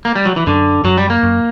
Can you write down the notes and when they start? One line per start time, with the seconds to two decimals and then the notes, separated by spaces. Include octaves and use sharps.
0.05 A#3
0.15 G3
0.25 F#3
0.36 E3
0.47 F#2 D3
0.84 F#2 F#3
0.97 G3
1.10 A#3
1.23 F#2